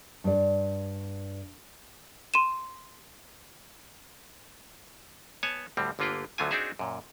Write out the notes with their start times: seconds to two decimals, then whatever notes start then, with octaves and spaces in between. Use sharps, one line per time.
0.24 G2 D5
2.34 C6 D#7 E7
5.43 B3 C#5 G#5 A5
5.77 D2 A2 G3 C4
5.99 G1 D3 A#3 F4 B4 G5
6.38 D2 D3 F#3 A3 F4 G#5
6.51 C4 D4 D#4 F#4 G#4 E5
6.79 F#2 A#2